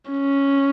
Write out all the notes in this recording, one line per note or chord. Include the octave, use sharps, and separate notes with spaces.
C#4